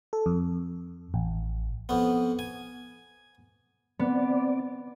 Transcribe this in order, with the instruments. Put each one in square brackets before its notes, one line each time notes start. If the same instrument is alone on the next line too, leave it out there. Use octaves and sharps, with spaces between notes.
[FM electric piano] A4
F2
A1
[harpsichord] F2 B3
G#5
[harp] B3 [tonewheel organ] C4 D5